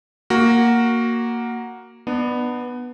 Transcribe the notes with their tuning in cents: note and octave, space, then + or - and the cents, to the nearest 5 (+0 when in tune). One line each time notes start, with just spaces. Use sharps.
A#3 +0 F#4 +0
B3 +0 D4 +35